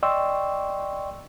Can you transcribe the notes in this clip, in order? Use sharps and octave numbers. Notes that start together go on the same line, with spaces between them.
D5 D#5 G5 C6 C#6 E6